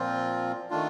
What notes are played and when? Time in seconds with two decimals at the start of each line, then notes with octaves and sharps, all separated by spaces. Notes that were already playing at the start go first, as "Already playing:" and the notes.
Already playing: A#2 F3 C4 F4
0.70 D#3 A3 D4 F4